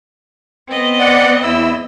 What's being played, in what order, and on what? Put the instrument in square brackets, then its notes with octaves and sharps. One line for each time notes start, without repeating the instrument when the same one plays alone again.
[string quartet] B3 C4 D#5
[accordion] D5 F#5
E2 E4 E6